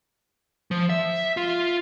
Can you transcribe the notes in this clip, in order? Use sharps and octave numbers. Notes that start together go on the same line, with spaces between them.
F3
E5
F4